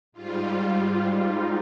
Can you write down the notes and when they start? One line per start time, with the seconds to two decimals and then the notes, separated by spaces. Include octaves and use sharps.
0.12 G#2 G3 F4
1.19 D#4